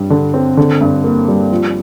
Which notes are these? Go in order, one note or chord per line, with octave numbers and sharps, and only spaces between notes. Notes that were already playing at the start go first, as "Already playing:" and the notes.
Already playing: G2 G3
D3
C4
D3
G2
A#3
G3
F3